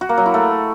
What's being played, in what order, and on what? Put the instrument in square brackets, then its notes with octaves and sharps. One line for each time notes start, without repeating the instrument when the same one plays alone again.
[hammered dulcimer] F#4
A#3
F#3
E4
A3